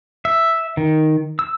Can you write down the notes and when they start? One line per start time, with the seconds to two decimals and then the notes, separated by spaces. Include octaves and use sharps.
0.25 E5
0.77 D#3
1.39 E6